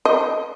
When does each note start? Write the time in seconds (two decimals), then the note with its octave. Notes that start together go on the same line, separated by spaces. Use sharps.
0.05 D#5